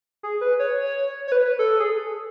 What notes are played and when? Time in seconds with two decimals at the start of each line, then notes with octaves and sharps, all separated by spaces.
0.23 G#4
0.41 B4
0.59 C#5
1.28 C#5
1.32 B4
1.59 A4
1.80 G#4